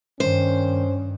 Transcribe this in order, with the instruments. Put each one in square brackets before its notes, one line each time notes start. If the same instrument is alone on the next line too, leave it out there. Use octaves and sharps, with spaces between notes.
[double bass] G2 [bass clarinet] D#3 [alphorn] C#4 [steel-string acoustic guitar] C5